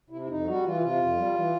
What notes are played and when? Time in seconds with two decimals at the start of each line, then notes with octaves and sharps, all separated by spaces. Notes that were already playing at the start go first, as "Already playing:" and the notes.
0.10 C3 E4
0.21 E4
0.28 F2 D#4
0.46 G3 F#4
0.64 E3 F4
0.80 C3 F4
0.99 F2
1.17 G3
1.34 E3